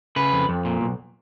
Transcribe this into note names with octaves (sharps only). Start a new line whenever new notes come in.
C#3 B4
F2
F2
A#2
B1